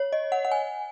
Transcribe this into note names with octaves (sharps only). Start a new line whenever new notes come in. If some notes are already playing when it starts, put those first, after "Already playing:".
Already playing: C#5
D#5
F#5
F#5
G#5